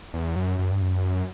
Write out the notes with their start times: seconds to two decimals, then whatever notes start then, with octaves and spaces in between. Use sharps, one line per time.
0.14 E2
0.36 F#2
0.59 F#2
0.72 G2
0.81 F#2